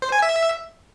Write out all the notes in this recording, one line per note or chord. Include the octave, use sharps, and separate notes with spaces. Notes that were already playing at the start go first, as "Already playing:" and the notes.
C5
G#5
E5